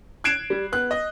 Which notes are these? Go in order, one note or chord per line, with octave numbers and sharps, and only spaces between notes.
F#6 G#6 C7 D7 E7
G3
B3 F#6
D#5